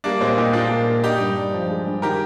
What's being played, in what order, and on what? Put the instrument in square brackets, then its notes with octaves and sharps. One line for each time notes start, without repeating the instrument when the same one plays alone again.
[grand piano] G3 [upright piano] A#3 D4
[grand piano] A#2 [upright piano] G#3 C4
[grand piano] A#2 [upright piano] D#4 G4
[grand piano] A#2 [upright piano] D4 F4
[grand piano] A#3
A#3
[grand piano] D4 [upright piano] D#4 G4
[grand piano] G2
D4
F3
G#3
G2
[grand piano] D#3 [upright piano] G4 A#4